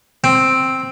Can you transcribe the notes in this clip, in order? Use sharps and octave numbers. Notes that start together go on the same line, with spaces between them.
C4